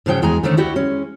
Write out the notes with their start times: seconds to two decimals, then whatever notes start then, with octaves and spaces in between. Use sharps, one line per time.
0.06 G#2 C#3 F3 F#3 G5
0.22 E2 G#3 G#5 A#5
0.43 D3 D#3 F3 A3 C#4
0.57 D2 E4 F#4 G4 D5
0.76 G#3 C#4